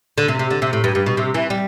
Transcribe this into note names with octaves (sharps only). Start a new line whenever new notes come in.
D3
C3
C3
D3
C3
A2
G2
G2
B2
C3
E3
G3